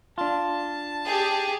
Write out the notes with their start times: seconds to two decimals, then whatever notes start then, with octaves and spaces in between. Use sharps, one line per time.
0.18 D4 F4 A5
1.06 G4 G#4